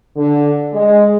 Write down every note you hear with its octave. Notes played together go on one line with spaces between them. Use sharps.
D3
G#3